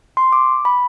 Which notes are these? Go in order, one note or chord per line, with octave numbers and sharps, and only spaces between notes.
C6
D6
B5